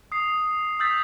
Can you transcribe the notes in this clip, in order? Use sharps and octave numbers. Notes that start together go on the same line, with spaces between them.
D#6 C7
D#6 E6 G6 A6 B6